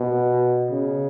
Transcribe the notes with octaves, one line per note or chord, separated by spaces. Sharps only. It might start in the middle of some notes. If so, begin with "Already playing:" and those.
Already playing: B2
C#3